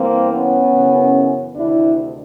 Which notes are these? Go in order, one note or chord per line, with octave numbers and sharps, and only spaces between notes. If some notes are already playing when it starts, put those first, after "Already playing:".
Already playing: G2 E3 A#3 C4
B3 C#4
F#2 C#3 E3
D2 C3 D#3 D4 E4